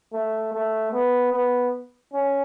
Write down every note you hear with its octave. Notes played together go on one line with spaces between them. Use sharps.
A3
A3
B3
B3
C#4